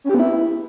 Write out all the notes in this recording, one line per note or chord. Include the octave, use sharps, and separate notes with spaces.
C#4
G4
B3
E4